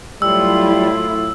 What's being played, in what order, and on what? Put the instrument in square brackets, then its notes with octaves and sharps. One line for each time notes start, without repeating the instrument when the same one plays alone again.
[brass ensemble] A2 [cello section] F#3 E4 F4 [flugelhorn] G3 [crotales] E6